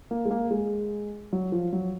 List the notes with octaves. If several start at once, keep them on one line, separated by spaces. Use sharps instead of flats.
A#3
G#3
A#3
G#3
F#3
F3
F#3